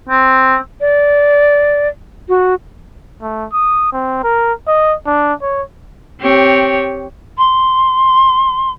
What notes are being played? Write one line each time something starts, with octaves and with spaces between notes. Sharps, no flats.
C4
D5
F#4
A3
D#6
C4
A#4
D#5
D4
C#5
C4 G4 C#5
C6